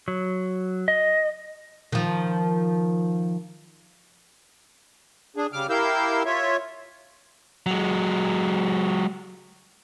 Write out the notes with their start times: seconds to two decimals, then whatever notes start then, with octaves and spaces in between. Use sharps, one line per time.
0.08 F#3
0.88 D#5
1.92 D#3 F3
5.36 D4 G#4
5.52 C#3 G3 D6 F6
5.70 E4 G4 A#4 F5 E6 G6
6.25 F4 C#5 E5
7.66 F#3 G#3